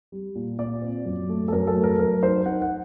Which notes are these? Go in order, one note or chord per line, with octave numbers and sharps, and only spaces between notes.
G3
A#2
A#2 D5
C4
F#2
A3
A4
F#2 A#4
A4
A3
A#4
F#2 A#4
D#4 C5
D#4 F#5
F#5